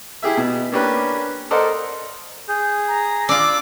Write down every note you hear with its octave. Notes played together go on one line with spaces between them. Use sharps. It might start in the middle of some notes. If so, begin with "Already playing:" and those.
E4 G4 G#4 E5
B2
A#3 C#4 D4 G4 B4
A4 A#4 C5 D5 D#5 F#5
G#4 G6
A#5
D4 F4 D6 E6